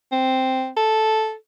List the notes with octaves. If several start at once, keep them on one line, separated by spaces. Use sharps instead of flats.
C4
A4